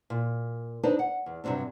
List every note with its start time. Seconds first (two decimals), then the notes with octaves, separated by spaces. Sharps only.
0.10 A#2
0.83 D4 D#4 B4 C5 D5
0.99 F#5
1.26 E2
1.44 G2 C3 F#3 C4 D4